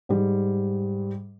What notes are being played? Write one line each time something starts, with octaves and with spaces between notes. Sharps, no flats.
G#2 G3